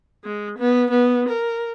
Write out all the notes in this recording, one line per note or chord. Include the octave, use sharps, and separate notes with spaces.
G#3
B3
B3
A#4